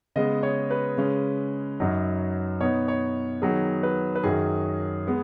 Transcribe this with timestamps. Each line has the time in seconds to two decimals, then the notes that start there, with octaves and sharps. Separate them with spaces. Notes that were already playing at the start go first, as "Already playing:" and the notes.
0.16 C#3 G#3 B3 D#5
0.43 C#5
0.70 B4
0.97 C#3 G#3 C#4
1.80 F#2 F#3 D#4
2.60 B2 B3 D#4 C#5
2.88 C#5
3.42 D#3 F#3 B3 D#4 G#4
3.83 B4
4.15 B4
4.23 F#2 D#3 F#3 G#4
5.07 G#3 B3